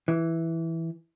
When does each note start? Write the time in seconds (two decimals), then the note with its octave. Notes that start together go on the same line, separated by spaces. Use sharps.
0.08 E3